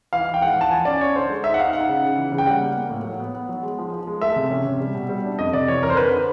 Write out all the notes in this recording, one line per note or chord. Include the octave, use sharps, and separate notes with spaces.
E3 F5
E3
G5
G#2 F#5
E3 A5
F3 G#5
C#4 D5
C#4 C#5
D3 C5
G#3
D#4 E5
F#5
D#4 F5
D#4 F#5
C#3
C#3
E3
C#3
G5
G3 F#5
A#3
A#3
A2
F#3
B3
B3
F#3
G#3
F3
F3
G#3
A3 E5
C3
C#4
C3
G3
B2
G3
D4
F2 D#5
C3 D5
E3 C#5
F2 A#4
C5
D3 B4
D3